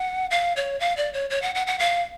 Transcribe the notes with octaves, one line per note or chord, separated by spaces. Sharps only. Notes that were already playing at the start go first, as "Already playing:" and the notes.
Already playing: F#5
F5
C#5
F5
D5
C#5
C#5
F#5
F#5
F#5
F5